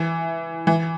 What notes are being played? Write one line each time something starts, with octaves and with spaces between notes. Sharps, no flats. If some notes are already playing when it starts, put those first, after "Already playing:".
Already playing: E3
E3